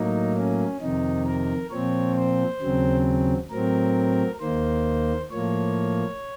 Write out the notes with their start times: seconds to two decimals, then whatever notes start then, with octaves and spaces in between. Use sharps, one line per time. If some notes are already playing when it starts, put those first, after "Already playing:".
Already playing: A2 F#3 A#3 D#4
0.36 C#4
0.81 F2 C3 D#3 D#4
1.26 A#4
1.71 A#2 F3 C4 C#5
2.16 C5
2.61 D#2 C#3 F#3 C4
3.51 A2 F#3 C4 A#4
4.41 D#2 D#3 A#3 C5
5.31 A2 F3 A#3 C#5